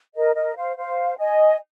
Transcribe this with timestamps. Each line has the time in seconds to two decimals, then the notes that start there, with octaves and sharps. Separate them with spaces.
0.14 A#4 D#5
0.35 A#4 D#5
0.56 C5 F5
0.77 C5 F5
1.18 D#5 G#5